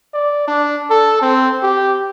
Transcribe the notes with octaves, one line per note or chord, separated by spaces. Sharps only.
D5
D4
A4
C4
G4